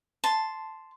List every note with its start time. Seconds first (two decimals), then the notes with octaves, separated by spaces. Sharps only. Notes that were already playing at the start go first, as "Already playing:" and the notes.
0.24 A5 C6